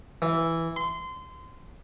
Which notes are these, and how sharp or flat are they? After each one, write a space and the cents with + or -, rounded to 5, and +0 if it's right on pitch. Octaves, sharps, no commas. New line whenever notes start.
E3 +0
C6 -25